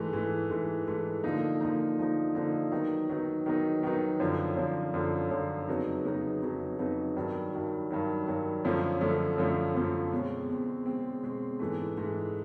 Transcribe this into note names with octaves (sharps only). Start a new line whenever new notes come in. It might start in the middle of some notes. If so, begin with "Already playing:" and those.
Already playing: G#2 E3 A3
G#2 E3 A3
G#2 E3 A3
G#2 E3 A3
D3 F3 A#3 D#4
D3 F3 A#3 D#4
D3 F3 A#3 D#4
D3 F3 A#3 D#4
D#3 F#3 B3 D#4
D#3 F#3 B3 D#4
D#3 F#3 B3 D#4
D#3 F#3 B3 D#4
F#2 D3 F3
F#2 D3 F3
F#2 D3 F3
F#2 D3 F3
F2 C#3 F#3 B3 D#4
F2 C#3 F#3 B3 D#4
F2 C#3 F#3 B3 D#4
F2 C#3 F#3 B3 D#4
G2 D#3 F#3
G2 D#3 F#3
G2 D#3 F#3
G2 D#3 F#3
F#2 D3 F3 A3 C#4
F#2 D3 F3 A3 C#4
F#2 D3 F3 A3 C#4
F#2 D3 F3 A3 C#4
B2 G#3 C4
B2 G#3 C4
B2 G#3 C4
B2 G#3 C4
G#2 E3 A3
G#2 E3 A3